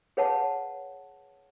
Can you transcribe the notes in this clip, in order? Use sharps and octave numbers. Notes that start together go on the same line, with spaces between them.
G#4 B4 C#5 F5 F#5 A5